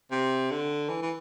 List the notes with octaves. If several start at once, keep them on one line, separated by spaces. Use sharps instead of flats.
C3
D3
E3
E3